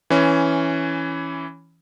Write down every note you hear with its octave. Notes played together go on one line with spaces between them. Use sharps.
E3 C#4